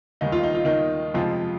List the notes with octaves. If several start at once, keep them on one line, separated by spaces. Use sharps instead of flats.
D#2 D#3 G3 D#4
F4
D#4
F4
D#3 D#4
F2 C3 F3 G#3 F4